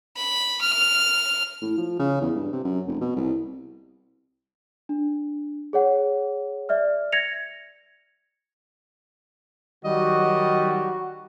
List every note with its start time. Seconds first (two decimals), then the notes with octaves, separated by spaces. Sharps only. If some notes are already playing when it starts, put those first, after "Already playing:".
0.17 B5
0.61 F6
1.62 A2
1.77 F3
1.99 C#3
2.21 E2
2.35 G2
2.52 C3
2.64 F#2
2.88 F1
3.01 B2
3.16 C2
4.89 D4
5.73 G#4 C#5 F#5
6.69 D5 E5 F6
7.12 G#6 A#6 C#7 F7
9.85 D#3 F#3 G3 F#4 D#5